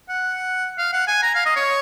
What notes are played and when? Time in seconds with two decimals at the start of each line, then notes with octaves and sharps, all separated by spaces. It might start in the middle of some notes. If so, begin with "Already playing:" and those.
0.09 F#5
0.78 F5
0.93 F#5
1.07 G#5
1.23 A#5
1.35 F5
1.46 D#5
1.56 C#5